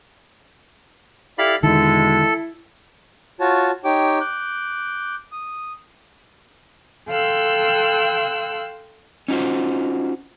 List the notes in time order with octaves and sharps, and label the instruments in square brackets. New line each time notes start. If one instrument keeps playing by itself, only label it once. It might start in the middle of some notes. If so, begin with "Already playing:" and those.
[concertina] E4 F5 B5 [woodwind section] G4 A4 D5
[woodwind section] E2 B2 G#3 [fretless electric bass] D3 D#3 [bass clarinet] E4 [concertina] A4
[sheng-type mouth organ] F4 F#4 C#5 A5
D#4 G4 C#5 G5 D6
D6 F#6 G6
D#6
[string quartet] A4 F5 G5 C6 E6 F#6
[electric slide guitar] C#4 D#4 F4 F#4 C5